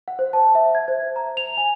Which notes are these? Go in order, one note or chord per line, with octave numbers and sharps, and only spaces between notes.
F#5
C5
A5
E5
G#6
C5
A#5
F7
G#5